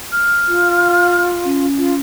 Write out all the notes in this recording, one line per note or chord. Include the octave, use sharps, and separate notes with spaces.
F6
F4
C#4
F4